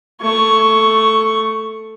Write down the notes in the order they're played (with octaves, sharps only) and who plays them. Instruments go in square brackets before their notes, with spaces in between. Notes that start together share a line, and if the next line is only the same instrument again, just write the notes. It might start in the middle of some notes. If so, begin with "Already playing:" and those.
[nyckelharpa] A3 C#6